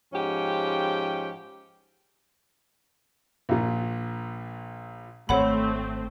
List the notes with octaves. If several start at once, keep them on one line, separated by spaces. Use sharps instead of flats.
G#2 F3 C#4 G4 G5
A#1 A#2
G#1 A3 C4 C#5 F#5 B5